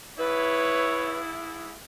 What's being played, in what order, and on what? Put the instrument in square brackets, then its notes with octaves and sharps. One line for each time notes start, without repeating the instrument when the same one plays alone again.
[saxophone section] G#2 E4 [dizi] B4 [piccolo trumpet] C#5